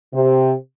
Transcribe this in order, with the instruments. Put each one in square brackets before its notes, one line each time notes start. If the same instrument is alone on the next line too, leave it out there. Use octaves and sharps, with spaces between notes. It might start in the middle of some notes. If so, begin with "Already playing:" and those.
[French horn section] C3